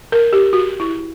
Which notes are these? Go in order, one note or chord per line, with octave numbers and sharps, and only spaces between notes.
A#4
G4
F#4
E4